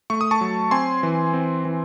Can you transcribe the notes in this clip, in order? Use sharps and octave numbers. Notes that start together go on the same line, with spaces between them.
A3 C#6
D#6
A5 C#6
F#3
C4 G#5 C6
E3
C4
E3